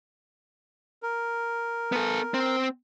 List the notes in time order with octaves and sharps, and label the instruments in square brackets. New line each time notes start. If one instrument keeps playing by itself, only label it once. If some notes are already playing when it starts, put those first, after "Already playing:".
[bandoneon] A#4
[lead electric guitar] B3 A4
C4